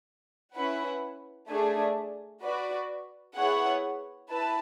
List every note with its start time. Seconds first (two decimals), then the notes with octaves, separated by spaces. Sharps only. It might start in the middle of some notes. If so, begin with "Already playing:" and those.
0.55 C#4 E4 B4 F#5
1.49 A3 D4 G#4
2.42 F#4 B4 D5
3.35 B3 E4 G#4 C#5 F#5
4.29 E4 B4 A5